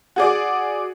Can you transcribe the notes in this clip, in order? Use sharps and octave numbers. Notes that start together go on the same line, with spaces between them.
F#4 G#4 D5